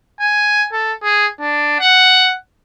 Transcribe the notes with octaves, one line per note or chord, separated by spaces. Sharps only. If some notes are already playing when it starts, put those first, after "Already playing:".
G#5
A4
G#4
D4
F#5